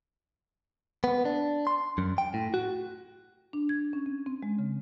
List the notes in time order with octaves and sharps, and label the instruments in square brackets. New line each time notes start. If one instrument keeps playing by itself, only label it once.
[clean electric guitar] B3
D4
C6
F#2
G5
A2
F#4
[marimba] D4
G#6
C#4
C4
C4
G#3
C#3